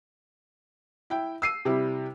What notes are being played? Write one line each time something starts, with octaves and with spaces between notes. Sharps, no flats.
E4 G5
E6 C7 D#7
C3 G3 E4